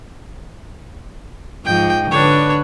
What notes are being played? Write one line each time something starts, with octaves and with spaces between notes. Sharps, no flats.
G#2 F3 D#5 G5
D3 D4 B4 C#5